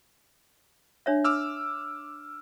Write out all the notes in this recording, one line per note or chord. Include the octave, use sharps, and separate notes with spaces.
D4 C#5 E5
D6 E6 F6